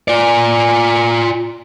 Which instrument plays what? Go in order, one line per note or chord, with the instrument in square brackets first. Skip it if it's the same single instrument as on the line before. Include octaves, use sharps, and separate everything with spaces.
[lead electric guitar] F4 D5